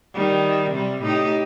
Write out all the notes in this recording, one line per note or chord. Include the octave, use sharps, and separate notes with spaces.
D#3 G3
C3 G3
A2 D#4 G4